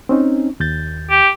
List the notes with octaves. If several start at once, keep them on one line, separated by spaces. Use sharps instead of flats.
C4 C#4 D#4
D#2 G6 A6
G4